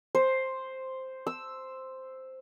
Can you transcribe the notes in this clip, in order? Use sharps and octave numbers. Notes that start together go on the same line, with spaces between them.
C5
E6